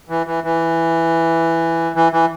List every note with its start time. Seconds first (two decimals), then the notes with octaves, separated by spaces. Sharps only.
0.09 E3
0.26 E3
0.44 E3
1.96 E3
2.12 E3